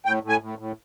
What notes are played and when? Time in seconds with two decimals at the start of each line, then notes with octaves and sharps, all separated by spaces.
0.06 A2 G5
0.23 A2
0.29 G#5
0.41 A2
0.59 A2